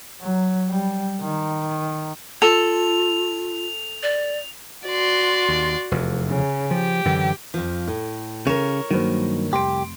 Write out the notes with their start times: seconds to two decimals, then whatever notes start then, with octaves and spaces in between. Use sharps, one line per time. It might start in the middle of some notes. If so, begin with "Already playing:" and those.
0.21 F#3
0.69 G3
1.21 D#3
2.42 F4 A4 F7
4.03 D5
4.87 F#4 D5 C6
5.49 D#2
5.91 F1 E2
6.28 C#3
6.71 F3 G4
7.05 F#2 D3 E3
7.54 F2 F3
7.87 A2
8.47 C#3 A#4 C#5 E7
8.91 G2 D#3 F#3 A#3 C5
9.52 F1 C2 G4 C6 D7